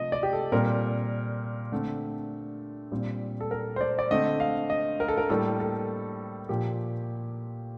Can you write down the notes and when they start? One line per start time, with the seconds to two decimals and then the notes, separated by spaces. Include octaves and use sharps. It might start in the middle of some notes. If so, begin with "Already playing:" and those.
Already playing: C3 F3 A3 D#5
0.12 D5
0.23 G4
0.33 A4
0.52 A#2 G3 C4 A#4
1.72 D3 A3 C4
2.92 A#2 G3 C4
3.41 A4
3.51 A#4
3.76 C5
3.81 D5
3.99 D5
4.11 D3 A3 C4 D#5
4.40 F5
4.70 D#5
5.00 A#4
5.08 A4
5.18 A#4
5.29 A2 G3 A#3 A4
5.60 A4
6.49 A#2 F3 A#3 G4